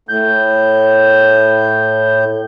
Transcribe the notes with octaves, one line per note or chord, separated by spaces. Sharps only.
A2 G6